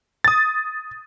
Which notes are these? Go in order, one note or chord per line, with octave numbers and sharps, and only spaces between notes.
D#6 A6